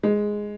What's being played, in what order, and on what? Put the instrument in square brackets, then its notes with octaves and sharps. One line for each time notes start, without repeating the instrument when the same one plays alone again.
[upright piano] G#3